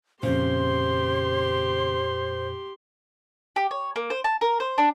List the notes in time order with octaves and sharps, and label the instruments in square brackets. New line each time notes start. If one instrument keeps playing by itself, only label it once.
[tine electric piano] F2 A#2 [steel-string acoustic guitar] C#3 [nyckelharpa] G4 C6 [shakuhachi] C5
[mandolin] G4
C#5
A#3
C5
A5
A#4
C5
D4